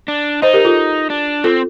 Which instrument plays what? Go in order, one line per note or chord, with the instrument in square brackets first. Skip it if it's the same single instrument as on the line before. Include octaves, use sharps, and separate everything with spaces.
[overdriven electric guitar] D4
[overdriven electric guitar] D#4 [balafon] C5 D#5
[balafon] G4 A#4
F4 A4
[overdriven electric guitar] D4
[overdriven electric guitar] C4 [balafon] F4 A4